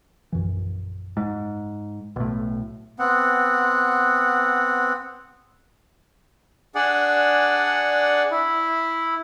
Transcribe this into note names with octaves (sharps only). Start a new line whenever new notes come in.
A#1 F#2 E3
G#2
B1 A2
B3 C4 F#5
D4 G#4 D5 F#5
E4